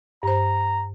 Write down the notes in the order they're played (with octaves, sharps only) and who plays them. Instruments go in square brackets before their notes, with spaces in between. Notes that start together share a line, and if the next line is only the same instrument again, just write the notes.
[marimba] G2 C5 [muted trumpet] A#5